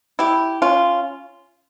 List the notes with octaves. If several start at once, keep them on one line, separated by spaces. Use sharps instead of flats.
E4 G4
C#4 F4